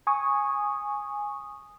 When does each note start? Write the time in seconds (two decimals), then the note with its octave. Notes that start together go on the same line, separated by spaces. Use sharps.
0.07 G#5 C#6 D#6